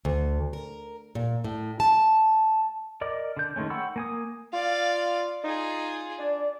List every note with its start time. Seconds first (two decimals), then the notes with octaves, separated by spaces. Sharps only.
0.05 D2
0.53 A#4
1.15 A#2
1.44 A2
1.80 A5
3.01 A#4 D5 D#5 D6
3.37 D3 G6
3.56 D#3 G#3 A3 C#4
3.70 F#5 G5 B5 C#6 E6
3.96 A#3 G#5 D#6
4.53 F4 D5 F5
5.44 D#4 F4 G#4
6.19 D4 D5